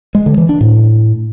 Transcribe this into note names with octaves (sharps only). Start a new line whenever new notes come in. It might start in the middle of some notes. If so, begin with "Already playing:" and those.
G#3
D3
E3
D4
A2